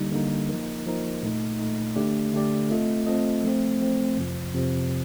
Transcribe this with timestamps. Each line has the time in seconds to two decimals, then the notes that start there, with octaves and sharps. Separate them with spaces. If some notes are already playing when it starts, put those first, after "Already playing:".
Already playing: D3 G3 A#3 D#4
0.12 D3 G3 A#3 D#4
0.49 F3 A#3 D#4 A#4
0.86 F3 A#3 D#4 A#4
1.22 A#2 A3 D#4
1.59 A#2 A3 D#4
1.96 D3 A3 D4 G4 D5
2.33 D3 A3 D4 G4 D5
2.69 A3 C4 F4 A4 D#5
3.06 A3 C4 F4 A4 D#5
3.43 F3 A3 C4
3.80 F3 A3 C4
4.17 F2 C3 F3
4.54 F2 C3 F3